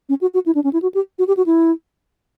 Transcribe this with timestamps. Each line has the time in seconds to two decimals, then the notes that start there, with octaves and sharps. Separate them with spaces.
0.09 C#4
0.21 F#4
0.34 F#4
0.46 E4
0.55 D4
0.64 C#4
0.73 E4
0.82 F#4
0.95 G4
1.19 F#4
1.28 G4
1.37 F#4
1.46 E4